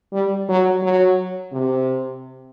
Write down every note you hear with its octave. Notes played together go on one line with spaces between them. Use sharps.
G3
F#3
F#3
C3